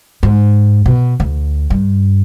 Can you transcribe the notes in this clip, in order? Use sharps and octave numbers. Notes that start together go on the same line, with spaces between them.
G#2
B2
D2
G2